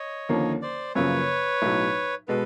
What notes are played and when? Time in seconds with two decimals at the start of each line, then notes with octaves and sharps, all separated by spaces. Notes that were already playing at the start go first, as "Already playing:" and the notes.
Already playing: C#5 D#5
0.29 D#2 D3 F3 A#3 C#4
0.62 C5 D5
0.95 F#2 C#3 F3 A#3 B4 C#5
1.62 B1 A2 F#3
2.28 B2 G#3 B3 A4 B4